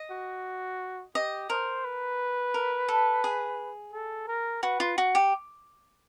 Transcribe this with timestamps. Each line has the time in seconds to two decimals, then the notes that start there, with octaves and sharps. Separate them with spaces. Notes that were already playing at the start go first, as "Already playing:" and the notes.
Already playing: D#5
0.11 F#4
1.15 G4 D#5
1.50 A#4 C5
1.84 B4
2.54 A#4
2.88 A4
3.24 G#4
3.93 A4
4.28 A#4
4.63 F#4 B4
4.80 F4
4.98 F#4
5.15 G4